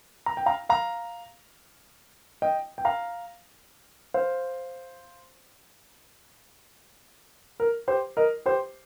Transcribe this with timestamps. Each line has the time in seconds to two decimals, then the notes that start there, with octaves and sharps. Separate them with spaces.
0.26 A#5
0.37 G5
0.46 F5 A#5
0.69 F5 A#5
2.42 D#5 G5
2.78 G5
2.85 F5 A#5
4.14 C5 F5
7.60 A#4
7.88 G4 C5
8.17 A#4 D#5
8.46 G4 C5